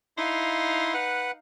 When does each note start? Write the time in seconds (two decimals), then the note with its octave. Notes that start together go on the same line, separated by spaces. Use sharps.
0.17 D#4 E4 F5 C6
0.94 B4 F#5